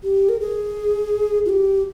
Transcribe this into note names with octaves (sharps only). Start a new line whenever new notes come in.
G4
A#4
G#4
F4
G4